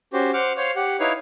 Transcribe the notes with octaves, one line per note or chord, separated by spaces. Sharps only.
C#4 F#4 G4 C5
C5 F#5 D6 F6
C5 C#5 F5 C#6
G4 F#5
D#4 E4 B4 C#5 F5